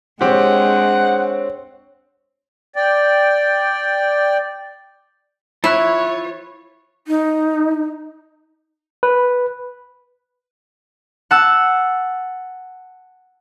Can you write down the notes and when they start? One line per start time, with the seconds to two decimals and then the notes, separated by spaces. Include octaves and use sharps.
0.21 G#3 C4 D4 G4 C5 C#5 F#5
2.76 D5 G5
5.64 E4 F4 C#5 B5 F#6
7.08 D#4
9.03 B4
11.31 F#5 A5 E6